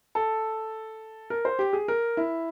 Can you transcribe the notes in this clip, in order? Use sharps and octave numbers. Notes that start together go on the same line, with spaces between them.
A4
A#4
C5
G4
G#4
A#4
E4